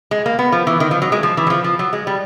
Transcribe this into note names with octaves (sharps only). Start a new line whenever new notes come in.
G#3
A#3
B3
F3
E3
D#3
F3
F#3
G#3
F3
E3
F#3
F3
F3
F#3
G#3
G3